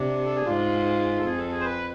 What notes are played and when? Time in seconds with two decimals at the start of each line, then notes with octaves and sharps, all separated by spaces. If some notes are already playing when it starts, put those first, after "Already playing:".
Already playing: C3 D4
0.26 A4
0.36 G#4
0.46 G#2 F4
1.19 A4
1.25 F2 G#4
1.38 A4
1.51 G#4
1.60 C5
1.65 B4